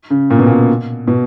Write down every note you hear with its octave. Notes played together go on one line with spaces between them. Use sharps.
C#3
A#2
B2
A#2
B2